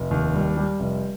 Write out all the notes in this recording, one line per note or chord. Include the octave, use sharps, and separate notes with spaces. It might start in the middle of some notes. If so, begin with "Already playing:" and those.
Already playing: F1
D#2
G3
G3
F1